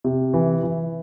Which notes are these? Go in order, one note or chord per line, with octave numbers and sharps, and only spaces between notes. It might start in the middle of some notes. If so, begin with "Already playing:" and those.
C3
E3
E3